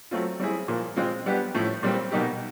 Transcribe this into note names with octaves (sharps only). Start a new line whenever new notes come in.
F#3 A3 C4 F4
G3 C4 E4 G#4
A#2 F3 A#3
G#3 C4 F4
G3 B3 D4 G4
A2 F3 A3 C#4 E4
A#2 G3 C4
B2 G3 A#3 D#4 G4